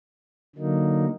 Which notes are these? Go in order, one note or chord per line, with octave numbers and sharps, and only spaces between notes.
D3 F#3 A#3 D#4